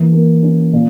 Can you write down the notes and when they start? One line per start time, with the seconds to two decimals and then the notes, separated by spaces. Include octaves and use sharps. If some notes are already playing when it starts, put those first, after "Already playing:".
Already playing: E3 A#3
0.12 A#3
0.43 C#4
0.73 A#2